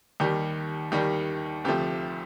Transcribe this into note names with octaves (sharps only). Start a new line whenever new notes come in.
D#2 D#3 G3 G4
D#2 D#3 G3 G4
D2 C3 F3 A3 G4